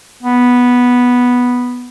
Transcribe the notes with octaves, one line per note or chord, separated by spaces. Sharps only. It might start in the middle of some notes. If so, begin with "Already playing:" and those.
B3